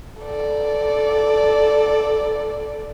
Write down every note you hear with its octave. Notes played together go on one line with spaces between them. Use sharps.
A4 D5